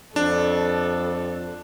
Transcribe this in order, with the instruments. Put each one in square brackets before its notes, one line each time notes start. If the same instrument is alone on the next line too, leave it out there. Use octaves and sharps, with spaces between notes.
[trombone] F2 [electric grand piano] D4 [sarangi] A4